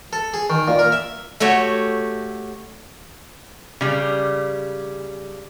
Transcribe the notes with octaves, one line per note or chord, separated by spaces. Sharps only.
A4
G#4
D#3
A#2
A#4
E5
A3 F#4 G4 C#5
C#3 G3